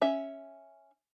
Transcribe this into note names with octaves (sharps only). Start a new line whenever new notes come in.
C#4 E5